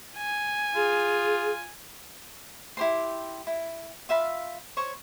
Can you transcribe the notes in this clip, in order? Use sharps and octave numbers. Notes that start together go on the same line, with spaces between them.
G#5
F4 G#4
E4 G4 C5 C6
E4
F4 E5 F5 B5
C5 C#5 C#6